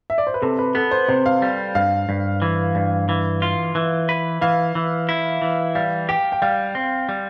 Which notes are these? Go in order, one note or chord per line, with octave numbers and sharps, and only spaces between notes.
E5
D5
C5
B4
C3 A4
B4
B3 A4
C5
C3 C5
F5
G3
G2 F5
G2
E3
G2
E3
F4
E3
B4
E3 F5
E3
E4
E3
G3 F5
G4 G5
G5
G3 F5
C4
G3